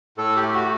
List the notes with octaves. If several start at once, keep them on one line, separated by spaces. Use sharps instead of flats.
A2 A4
G4
A3
G4
F#4